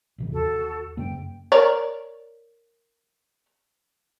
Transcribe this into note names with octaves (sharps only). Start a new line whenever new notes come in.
A1 C3 E3
D#2 F#4 A4
F#2 C#3 A#3 G5
A#4 C#5 D5